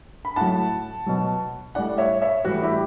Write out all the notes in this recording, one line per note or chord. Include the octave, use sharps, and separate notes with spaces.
B5
A2 F#3 F#5 A5
B2 F#3
A2 G3 D5 F#5
C#5 E5
C#5 E5
A2 E3 G3 F#4
E4 G4